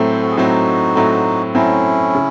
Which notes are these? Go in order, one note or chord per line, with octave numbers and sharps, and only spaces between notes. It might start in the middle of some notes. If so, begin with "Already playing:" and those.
Already playing: A2 F#3 A3 C4
C5
F#4 A4
G#4
A2 F#3 A3 C4 D#4 F#4
A2 F#3 A3 C4
A2 F#3 A3 C4 C#4 E4
C#3